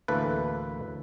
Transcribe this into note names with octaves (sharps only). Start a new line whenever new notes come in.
D2 A2 E3 A#3 A4 B4